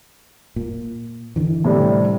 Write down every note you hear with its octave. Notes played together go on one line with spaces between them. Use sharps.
A#2
D3 E3
A2 C3 G3